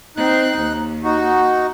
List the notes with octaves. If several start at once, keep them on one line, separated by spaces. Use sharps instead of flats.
C4 D#4 F#6
D#2
D#4 F#4